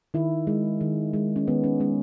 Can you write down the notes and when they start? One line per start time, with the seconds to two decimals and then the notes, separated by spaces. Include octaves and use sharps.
0.14 D#3 E4
0.47 G#3
0.81 D#3
1.13 G#3
1.36 C#4
1.48 D#3 B3
1.64 C#4
1.80 G#3 C#4